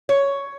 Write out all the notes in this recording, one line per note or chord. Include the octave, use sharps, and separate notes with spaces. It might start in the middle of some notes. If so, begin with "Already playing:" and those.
C#5